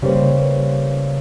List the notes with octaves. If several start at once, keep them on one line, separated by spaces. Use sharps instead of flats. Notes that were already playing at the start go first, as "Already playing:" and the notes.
C#3 G3 A#3 B4 C5